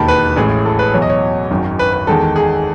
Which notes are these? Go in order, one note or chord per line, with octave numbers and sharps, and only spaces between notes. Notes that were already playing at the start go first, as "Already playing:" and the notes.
Already playing: E1 D#2 D#3 A5 B5
B4
A1 A2 G#3 G#4
A4
B4
E2 B2 F#3 C#5
D#5
C#5
G#1 F#2 D#3
B4
B4
E2 D#3 G#3 A4
G#4